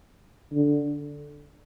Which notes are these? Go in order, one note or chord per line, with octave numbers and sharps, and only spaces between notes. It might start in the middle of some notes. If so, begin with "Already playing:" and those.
D3